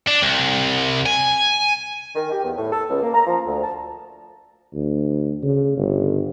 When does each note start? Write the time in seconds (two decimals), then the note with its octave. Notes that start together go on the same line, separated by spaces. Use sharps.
0.08 D4
0.23 C2
1.06 G#5
2.16 D#3
2.31 G4
2.44 E2
2.58 A2
2.73 A4
2.90 C#2
3.03 A#3
3.14 A#5
3.27 F3
3.46 D2
3.64 A5
4.74 D2
5.43 C#3
5.77 G1